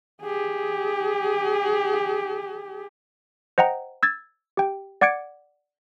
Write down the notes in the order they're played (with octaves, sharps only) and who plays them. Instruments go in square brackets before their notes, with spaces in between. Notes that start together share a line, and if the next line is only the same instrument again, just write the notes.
[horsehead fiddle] G4 G#4
[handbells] C5 D#5 F#5 G5 A#5
E6 G#6 A6
G4 G5
D5 F#5 D6 G#6 C#7 D7